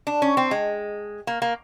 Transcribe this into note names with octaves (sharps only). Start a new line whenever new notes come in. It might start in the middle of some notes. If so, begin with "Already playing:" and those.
D4
C#4
C4
G#3
A#3
A#3